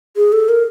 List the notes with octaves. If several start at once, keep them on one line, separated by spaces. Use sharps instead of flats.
G#4
A4
A#4